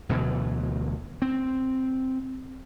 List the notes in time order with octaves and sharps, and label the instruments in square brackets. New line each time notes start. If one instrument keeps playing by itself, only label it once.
[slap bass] D2 B2 E3 F#3
C4